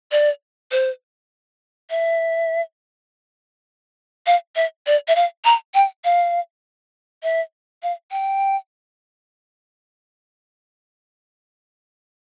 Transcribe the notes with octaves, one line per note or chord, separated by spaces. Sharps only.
D5
C5
E5
F5
E5
D5
E5
F5
A#5
G5
F5
E5
F5
G5